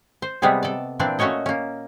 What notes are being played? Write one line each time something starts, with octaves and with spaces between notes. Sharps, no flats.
C5
C3 G3 G#3 B3 G#4
A4 D5
A#2 E3 C4 D4 D5
A#2 A3 C#4 F#4 C#5 D#5
A#3 C#4